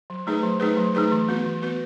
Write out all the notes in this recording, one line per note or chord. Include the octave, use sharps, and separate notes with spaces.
F#3
A3 D#4 G#4 B4
F#3
A3 D#4 G#4 B4
F#3
A3 D#4 G#4 B4
E3
B3 F#4 B4
E3
B3 F#4 B4